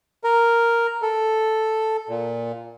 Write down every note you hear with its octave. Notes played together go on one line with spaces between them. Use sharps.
A#4
A4
A#2